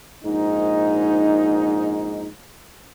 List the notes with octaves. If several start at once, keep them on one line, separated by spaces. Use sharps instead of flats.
A#1 G#2 D#4